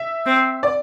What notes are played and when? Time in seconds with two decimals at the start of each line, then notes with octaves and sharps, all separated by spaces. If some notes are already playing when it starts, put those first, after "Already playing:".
Already playing: E5
0.26 C4
0.63 D5